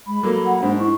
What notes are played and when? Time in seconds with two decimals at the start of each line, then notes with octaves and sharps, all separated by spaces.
0.07 G#3 B5
0.23 F#3 A#3 A4
0.45 F#5
0.63 G#2 D4 C5
0.80 E4 C#6